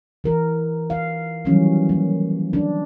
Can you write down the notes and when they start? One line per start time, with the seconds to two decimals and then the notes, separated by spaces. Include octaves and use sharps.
0.24 E3 A#4
0.90 F5
1.45 D#3 E3 F#3 G3 C#4
1.89 A#3
2.53 D4